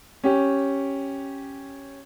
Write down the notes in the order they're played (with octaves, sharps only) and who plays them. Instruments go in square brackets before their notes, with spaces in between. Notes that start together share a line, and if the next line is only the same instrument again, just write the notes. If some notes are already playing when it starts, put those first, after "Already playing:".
[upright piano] C#4 G4